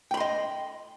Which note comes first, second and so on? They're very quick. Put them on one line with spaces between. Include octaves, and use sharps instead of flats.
G5 B5 C6 D#5